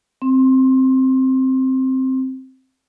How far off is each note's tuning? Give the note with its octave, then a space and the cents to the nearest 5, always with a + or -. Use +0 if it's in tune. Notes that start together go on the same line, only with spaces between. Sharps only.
C4 +0 C6 +25